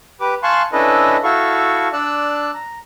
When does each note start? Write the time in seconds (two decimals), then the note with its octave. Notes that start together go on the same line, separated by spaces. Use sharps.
0.21 G4 B4 D6
0.43 F5 G#5 A5 C6 C#6 F#6
0.73 C#4 D4 E4 A4 B4 D#5
1.24 E4 F#4 A4 F5 C#6
1.93 D4 D5 E6 F#6
2.54 A#5